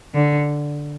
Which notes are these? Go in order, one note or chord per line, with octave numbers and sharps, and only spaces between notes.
D3